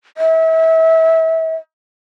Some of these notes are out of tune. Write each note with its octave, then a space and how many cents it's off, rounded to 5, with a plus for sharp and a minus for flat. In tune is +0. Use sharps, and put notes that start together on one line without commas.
E5 -30